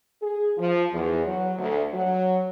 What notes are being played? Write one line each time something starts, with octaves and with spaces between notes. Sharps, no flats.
G#4
F3
E2
F#3
D2
F#3